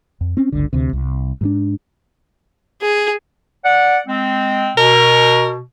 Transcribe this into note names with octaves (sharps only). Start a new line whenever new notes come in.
F2
C4 C#4
G1 C#2 D3
D2 C3
C2
G#2 E3 D4
G#4
D5 F#5
G#3 C4
B2 A#4